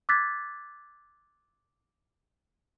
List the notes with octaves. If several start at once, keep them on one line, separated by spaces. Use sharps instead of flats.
D6 E6 F#6 G#6 A6 B6